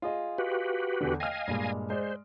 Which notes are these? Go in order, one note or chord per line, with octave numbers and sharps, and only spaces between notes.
F4 G#4 D#5
F#4 G4 B4
E2 D3
D#5 F5 G5 G#5 F6
G2 A#2 G#3
G#3 C5 D5